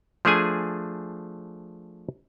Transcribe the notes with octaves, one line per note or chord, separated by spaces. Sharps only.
F3 A3 D4 G#4 G#5